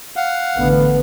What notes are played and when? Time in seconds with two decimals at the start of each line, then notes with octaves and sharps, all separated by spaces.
0.16 F5 F#5
0.56 A1 D3 B3